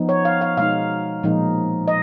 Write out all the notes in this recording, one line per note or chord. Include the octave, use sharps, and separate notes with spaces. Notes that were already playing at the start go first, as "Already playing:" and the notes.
Already playing: F3 B3 D#4
C#5
F5
F5
B2 G#3 D#4 F5
A#2 F3 G#3 D#4
D#5